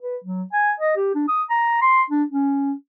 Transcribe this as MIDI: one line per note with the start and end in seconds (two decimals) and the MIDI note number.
0.02 0.17 71
0.24 0.43 54
0.53 0.71 80
0.80 0.96 75
0.96 1.13 67
1.15 1.23 62
1.28 1.43 87
1.50 1.77 82
1.81 2.02 84
2.10 2.23 62
2.30 2.72 61